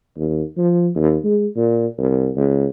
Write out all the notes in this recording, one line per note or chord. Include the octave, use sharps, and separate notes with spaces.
D#2
F3
D#2
G#3
A#2
C2
C#2